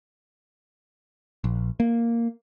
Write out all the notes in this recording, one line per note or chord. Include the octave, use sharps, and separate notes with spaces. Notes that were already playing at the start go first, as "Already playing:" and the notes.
A#1
A#3